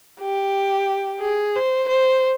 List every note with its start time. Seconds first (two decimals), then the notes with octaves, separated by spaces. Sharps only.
0.21 G4
1.21 G#4
1.56 C5
1.88 C5